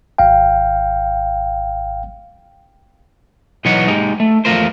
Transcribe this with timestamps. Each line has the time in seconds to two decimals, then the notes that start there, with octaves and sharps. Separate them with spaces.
0.18 G#1 F5 G5
3.65 B1 E3 B3 D#4 C#5 F#5
3.88 G#3 D#4 G4
4.20 A3
4.45 E2 F3 A3 F4 A#4 C5